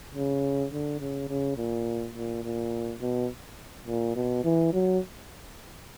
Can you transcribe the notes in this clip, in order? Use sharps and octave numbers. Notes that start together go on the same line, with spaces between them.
C#3
D3
C#3
C#3
A#2
A#2
A#2
B2
A#2
B2
E3
F#3